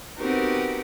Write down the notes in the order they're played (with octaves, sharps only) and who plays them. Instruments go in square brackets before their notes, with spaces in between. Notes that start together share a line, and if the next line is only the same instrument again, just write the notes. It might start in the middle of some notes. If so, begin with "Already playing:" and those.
[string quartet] B3 C4 D#4 F#4 G4 A#4